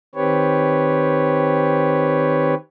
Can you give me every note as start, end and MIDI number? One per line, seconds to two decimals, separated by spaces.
0.15 2.54 51
0.15 2.54 60
0.15 2.54 67
0.15 2.54 71
0.15 2.54 73